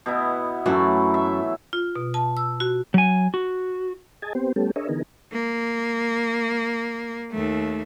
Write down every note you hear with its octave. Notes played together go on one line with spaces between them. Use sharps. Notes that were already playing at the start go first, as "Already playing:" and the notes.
B2 B3 E4
F#2 E3 F#3 A3 F#4
E5
F4
B2
A5
E6
F#4
F#3 G#5
F#4
G#4 D#5 G#5 A5
B3 C4 G4 C5
G3 A3 B3 C#4 G4 A4
D4 G#4 A#4 C#5 D#5 E5
D3 E3 B3 D#4 G#4 A#4
A#3
D#2 A3